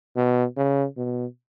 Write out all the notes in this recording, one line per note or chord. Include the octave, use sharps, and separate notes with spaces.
B2
C#3
B2